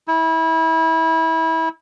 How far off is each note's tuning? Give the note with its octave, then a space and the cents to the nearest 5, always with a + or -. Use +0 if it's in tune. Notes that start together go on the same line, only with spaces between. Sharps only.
E4 -25